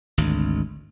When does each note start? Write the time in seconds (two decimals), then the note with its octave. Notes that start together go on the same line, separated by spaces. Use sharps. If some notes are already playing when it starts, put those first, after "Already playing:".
0.18 G#1 D2